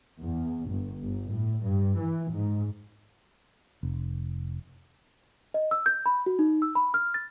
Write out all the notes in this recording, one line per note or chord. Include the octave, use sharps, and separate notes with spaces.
E2
G1
G1
A2
G2
E3
G#2
F1
D#5
E6
G6
B5
F#4
D#4
E6
B5
F6
A6